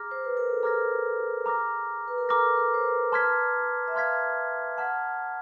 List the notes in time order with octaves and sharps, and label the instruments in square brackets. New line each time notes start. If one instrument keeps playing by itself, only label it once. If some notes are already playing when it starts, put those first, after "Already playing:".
Already playing: [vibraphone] G#4 [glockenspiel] A#5 D6 F6 A#6
[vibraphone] C5
B4
A#4
A4
[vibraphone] G#4 [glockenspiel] A#5 D6 F6 A#6
[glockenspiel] A#5 D6 F6 A#6
[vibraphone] B4
A#4
[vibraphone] A4 [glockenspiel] A#5 D6 F6 A#6
[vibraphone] A#4
C5
B4
[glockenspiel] A5 C6 F6 G#6 B6
[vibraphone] E5
[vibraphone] F5 [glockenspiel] A5 C6 F6 G#6 B6
[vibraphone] F#5 [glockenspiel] A5 C6 F6 G#6 B6